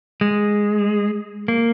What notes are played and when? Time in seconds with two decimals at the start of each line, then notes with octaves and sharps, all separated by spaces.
0.21 G#3
1.48 A#3